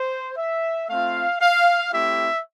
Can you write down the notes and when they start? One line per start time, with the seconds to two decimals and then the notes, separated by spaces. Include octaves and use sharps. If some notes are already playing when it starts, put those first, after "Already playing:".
Already playing: C5
0.37 E5
0.89 A3 C4 F4 F5
1.41 F5
1.93 A3 C4 E4 G4 E5